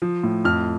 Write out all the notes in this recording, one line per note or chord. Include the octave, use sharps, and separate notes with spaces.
F3
A2
F2 F6